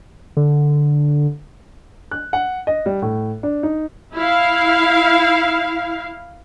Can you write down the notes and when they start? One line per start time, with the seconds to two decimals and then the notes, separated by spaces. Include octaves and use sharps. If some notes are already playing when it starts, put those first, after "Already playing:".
0.37 D3
2.11 F#6
2.33 F#5
2.67 D#5
2.86 G3
3.02 A2
3.43 D4
3.63 D#4
4.14 E4 F5